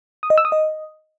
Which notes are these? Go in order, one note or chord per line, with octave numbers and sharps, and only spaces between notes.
D#6
D#5
E6
D#6
D#5